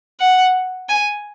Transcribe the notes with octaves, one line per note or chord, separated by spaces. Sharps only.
F#5
G#5